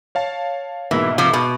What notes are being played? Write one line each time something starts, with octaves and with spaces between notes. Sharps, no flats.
C#5 F5 A5
G#2 B2 E3 A#3
C3 F3
B2